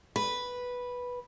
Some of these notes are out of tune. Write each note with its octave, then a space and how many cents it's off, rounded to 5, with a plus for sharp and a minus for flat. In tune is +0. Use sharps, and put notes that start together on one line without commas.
B4 -5